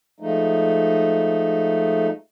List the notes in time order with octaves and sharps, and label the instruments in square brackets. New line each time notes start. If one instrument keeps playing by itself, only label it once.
[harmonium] F3 G#3 A3 D#4